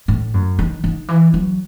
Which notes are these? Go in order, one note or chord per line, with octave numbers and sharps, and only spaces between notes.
A2
F#2
D#3
D#3
E3
F#3